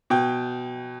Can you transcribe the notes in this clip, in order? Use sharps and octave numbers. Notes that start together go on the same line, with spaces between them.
B2 G5